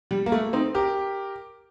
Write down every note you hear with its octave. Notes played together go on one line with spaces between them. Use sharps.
G3
A#3
A3
C4 D#4
G4 A#4